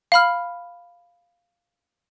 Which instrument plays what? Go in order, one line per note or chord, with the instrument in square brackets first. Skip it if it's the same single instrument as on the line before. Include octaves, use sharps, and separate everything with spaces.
[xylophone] F5 B5 F6